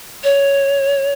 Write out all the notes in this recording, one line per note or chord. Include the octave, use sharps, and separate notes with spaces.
C#5